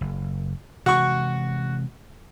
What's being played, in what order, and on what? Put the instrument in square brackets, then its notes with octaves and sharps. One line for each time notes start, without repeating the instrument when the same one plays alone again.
[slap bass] F#1
[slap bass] C3 E3 G#3 [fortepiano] F#4 C#6